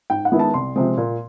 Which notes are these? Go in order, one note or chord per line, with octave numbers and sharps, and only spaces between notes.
G#2 G5
F#5
D#3 G#3 B3 E4
A5
C2 C6
C3 F3 G#3 C4
A#2